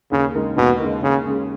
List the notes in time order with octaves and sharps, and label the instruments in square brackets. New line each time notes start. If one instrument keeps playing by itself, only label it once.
[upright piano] D#2 [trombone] C#3
[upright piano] C#3 G#3 D#4 A#4
[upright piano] D#2 [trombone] B2
[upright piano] C#3 G#3 D#4 A#4
[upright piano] D#2 [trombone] C#3
[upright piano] C#3 G#3 C#4 G#4